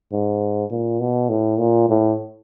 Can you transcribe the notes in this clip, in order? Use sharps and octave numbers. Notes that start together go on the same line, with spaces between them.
G#2
A#2
B2
A2
A#2
A2